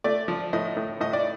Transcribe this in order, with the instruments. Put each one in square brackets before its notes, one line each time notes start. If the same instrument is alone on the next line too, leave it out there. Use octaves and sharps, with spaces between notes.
[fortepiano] A3 D5
F3
A2 D#5
A2
A2 D#5
D5